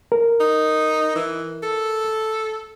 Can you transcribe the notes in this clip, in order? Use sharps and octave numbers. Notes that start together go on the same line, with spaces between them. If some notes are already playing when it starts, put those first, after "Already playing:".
A#4
D#4
E3
A4